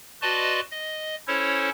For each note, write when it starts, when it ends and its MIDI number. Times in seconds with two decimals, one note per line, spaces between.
0.22 0.60 66
0.22 0.60 71
0.22 0.60 74
0.22 0.60 75
0.22 0.60 81
0.22 0.60 84
0.71 1.16 75
1.27 1.69 61
1.27 1.69 64
1.27 1.69 69
1.27 1.69 72
1.27 1.69 73